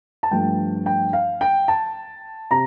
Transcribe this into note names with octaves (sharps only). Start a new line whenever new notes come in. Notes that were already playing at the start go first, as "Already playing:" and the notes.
A5
G2 F3 A3 G5
G5
F5
G5
A5
C3 A#5